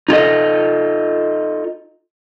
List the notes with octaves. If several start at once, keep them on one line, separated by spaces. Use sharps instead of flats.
D#4 F4 A4 D#5